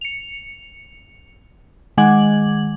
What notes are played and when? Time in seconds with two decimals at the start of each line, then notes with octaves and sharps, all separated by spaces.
0.01 C#7 F7
1.98 D#3 G#3 F#5 D6 G#6 F#7